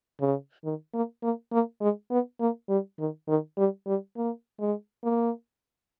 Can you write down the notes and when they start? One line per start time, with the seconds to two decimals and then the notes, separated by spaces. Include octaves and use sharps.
0.20 C#3
0.65 D#3
0.94 A#3
1.23 A#3
1.52 A#3
1.81 G#3
2.11 B3
2.40 A#3
2.69 G3
2.99 D#3
3.29 D#3
3.58 G3
3.87 G3
4.17 A#3
4.60 G#3
5.04 A#3